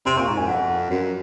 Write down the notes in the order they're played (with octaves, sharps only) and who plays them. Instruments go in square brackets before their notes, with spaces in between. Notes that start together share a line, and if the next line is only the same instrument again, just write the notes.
[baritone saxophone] C3 [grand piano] C6
[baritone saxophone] A#2 [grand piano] C#6
[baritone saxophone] G#2 [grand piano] A#5
[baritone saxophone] F#2 [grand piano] G#5
[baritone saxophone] F2 [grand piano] F#5
[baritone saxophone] F#2